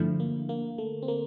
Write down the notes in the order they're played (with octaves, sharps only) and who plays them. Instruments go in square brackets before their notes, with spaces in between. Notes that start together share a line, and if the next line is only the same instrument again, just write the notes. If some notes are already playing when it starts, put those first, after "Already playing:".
Already playing: [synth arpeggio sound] G2 F3 A3 E4 [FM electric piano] D3
[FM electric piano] A#3
A#3
A3
C4
A#3